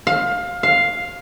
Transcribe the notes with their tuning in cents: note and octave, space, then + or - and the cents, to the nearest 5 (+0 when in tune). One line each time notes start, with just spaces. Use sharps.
F5 +20
F5 +0